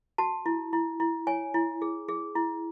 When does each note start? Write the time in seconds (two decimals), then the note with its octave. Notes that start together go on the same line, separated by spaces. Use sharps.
0.18 F#4 A5
0.46 E4
0.73 E4
1.00 E4
1.27 C#5 G#5
1.54 E4
1.82 G#4
2.08 G#4
2.35 E4